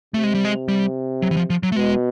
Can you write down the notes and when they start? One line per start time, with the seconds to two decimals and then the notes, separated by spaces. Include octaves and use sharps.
0.14 C3 A3
0.23 G#3
0.34 G3
0.45 G#3
0.68 G3
1.22 F#3
1.31 E3
1.37 F3
1.50 F3
1.63 F#3
1.72 A3
1.76 B2 G#3